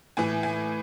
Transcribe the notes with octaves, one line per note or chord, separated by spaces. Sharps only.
A2 E3 G#5
G#5